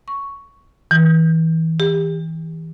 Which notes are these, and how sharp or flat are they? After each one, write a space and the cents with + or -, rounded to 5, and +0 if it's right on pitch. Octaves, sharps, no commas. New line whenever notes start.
C#6 +5
E3 -30
G4 +35